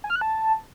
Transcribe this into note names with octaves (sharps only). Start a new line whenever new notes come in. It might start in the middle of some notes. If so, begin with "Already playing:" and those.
G#5
F6
F#6
A5